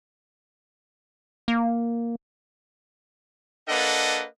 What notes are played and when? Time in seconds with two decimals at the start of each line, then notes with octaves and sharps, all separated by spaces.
1.48 A#3
3.68 A#3 D4 A4 B4 D#5 F#5